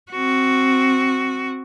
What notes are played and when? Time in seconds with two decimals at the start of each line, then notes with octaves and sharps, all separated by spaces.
0.11 C4 F#4